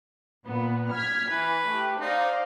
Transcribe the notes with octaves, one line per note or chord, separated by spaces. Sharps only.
A#2 B3
F6 G#6 B6
E3 B4
A3 G4
D#4 C5 D5 F5